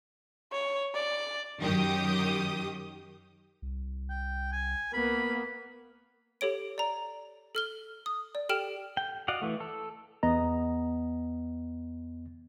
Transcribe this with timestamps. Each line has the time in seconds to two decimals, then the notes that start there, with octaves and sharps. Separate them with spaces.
0.52 C#5
0.94 D5
1.60 F#2 D#3 F#3 G4 D#6
3.62 C2
4.10 G5
4.52 G#5
4.93 A#3 B3 B5
6.41 G4 A4 C#5 D7
6.78 D5 A#5
7.55 A4 F6 G7
8.06 D#6
8.35 D5
8.49 G4 A4 G5 F6 D7 E7
8.97 G5
9.28 F#4 D5 D#5 F5 F#5
9.42 E3 A3
9.60 A4
10.23 E2 B3 D#5 A#5